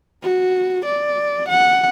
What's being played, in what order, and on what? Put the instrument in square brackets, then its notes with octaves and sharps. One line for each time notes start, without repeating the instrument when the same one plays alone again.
[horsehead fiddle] F#4
D5
F#5